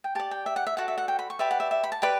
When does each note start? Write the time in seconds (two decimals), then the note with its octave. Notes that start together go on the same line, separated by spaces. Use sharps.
0.04 G5
0.15 G4 D5 A5
0.31 G5
0.46 E5
0.56 F#5
0.67 E5
0.77 F#4 A4 D5 F#5
0.88 E5
0.98 F#5
1.08 G5
1.19 B5
1.30 C#6
1.39 G4 B4 D5 E5
1.51 F#5
1.60 E5
1.71 E5
1.84 B5
1.92 A5
2.02 G4 B4 D5 B5